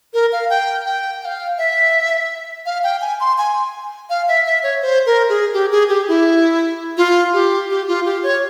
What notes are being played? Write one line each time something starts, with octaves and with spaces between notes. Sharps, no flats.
A#4
F5
G5
G5
G5
F5
E5
F5
G5
G#5
C6
G#5
F5
E5
E5
C#5
C5
A#4
G#4
G4
G#4
G4
E4
F4
G4
G4
F4
G4
C#5